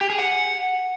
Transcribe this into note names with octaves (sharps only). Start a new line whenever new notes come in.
G4
G#4
F#5